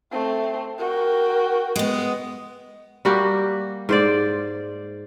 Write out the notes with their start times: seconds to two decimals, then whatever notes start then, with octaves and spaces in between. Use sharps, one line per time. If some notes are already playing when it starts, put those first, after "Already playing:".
0.12 A3 C4
0.78 F#4 A#4 G5
1.76 G#3 B3
3.05 G3 A#3 F#4 G4
3.89 G#2 C5 D5